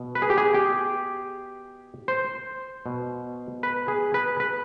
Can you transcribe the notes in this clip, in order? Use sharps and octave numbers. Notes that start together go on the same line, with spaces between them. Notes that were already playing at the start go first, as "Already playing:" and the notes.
Already playing: B2
B4
G#4
G4
G#4
G4
C5
B2
B4
G#4
B4
B4